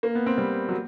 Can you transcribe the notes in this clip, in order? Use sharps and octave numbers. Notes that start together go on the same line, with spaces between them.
A#3
B3
C4
G3
F#3